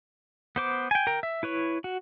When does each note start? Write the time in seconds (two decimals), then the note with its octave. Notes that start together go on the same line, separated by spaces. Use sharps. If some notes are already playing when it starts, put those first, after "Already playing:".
0.56 B3 C5 D6
0.91 G5 G#5
1.07 A#4 G5
1.23 E5
1.43 E4 B4 C#5
1.84 F#4